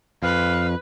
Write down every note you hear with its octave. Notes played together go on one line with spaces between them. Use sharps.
F2 B4 F5